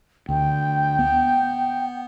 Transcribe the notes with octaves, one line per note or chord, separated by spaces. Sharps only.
D2 G5
B3